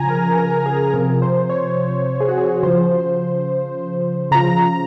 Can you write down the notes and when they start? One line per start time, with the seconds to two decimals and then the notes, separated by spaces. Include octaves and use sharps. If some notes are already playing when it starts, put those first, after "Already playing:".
Already playing: C#3 F3 G#5 A#5
0.09 A#4
0.37 A#4
0.66 G#4
0.94 C3 F3 A#4
1.22 C5
1.49 C#5
2.20 G#4
2.29 F#4
2.38 G#4
2.63 C#3 F3 C5
4.31 C#3 F3 A#5